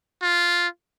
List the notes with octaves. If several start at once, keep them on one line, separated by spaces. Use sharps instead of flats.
F4